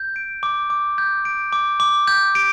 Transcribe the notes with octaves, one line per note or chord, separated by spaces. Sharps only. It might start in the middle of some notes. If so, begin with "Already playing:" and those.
Already playing: G6
D7
D6
D6
G6
D7
D6
D6
G6
D7